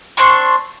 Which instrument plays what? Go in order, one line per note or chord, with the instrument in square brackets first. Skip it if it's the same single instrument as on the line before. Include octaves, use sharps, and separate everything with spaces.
[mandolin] C4 D4 C6 C#6